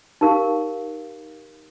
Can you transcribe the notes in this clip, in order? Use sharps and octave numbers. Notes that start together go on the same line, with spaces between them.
D#4 G4 A#4 F5